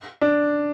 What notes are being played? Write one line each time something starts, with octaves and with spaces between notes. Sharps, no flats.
D4